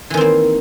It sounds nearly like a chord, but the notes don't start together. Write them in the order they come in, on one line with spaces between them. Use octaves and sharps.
E3 D#3 C4 A#3